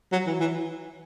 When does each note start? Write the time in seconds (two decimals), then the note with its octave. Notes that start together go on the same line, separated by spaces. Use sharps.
0.12 F#3
0.27 E3
0.40 E3